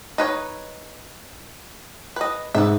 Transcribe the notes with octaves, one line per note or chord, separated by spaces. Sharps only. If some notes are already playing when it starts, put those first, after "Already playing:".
D#4 B4 C#5
B4 D#5
G#2 B3 E5